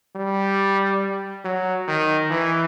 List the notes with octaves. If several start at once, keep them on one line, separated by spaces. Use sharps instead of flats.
G3
F#3
D#3
E3